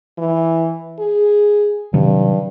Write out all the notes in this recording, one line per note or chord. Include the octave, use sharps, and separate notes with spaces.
E3
G#4
G2 C3 D#3 F#3